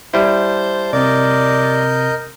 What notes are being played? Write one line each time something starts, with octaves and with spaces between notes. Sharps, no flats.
G3 E4 C5 A5
C3 C4 A#4 D5 D#5 G6